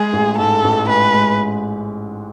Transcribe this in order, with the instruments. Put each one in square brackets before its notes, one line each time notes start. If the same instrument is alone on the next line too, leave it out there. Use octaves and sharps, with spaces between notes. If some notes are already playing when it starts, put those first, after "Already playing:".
Already playing: [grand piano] G#3 [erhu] G#4
[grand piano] A1
[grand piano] G#2 [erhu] A4
[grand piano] A1
[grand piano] G#3 [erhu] B4
[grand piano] G#3